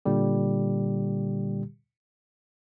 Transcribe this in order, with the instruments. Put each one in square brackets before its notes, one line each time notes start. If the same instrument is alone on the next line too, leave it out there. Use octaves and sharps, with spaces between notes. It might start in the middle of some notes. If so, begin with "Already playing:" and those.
[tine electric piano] A#2 D3 G3 G4